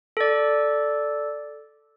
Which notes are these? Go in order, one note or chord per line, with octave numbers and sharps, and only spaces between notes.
A4 D5